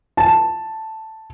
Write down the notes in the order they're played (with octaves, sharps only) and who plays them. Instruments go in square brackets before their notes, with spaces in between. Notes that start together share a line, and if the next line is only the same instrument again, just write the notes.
[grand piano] A5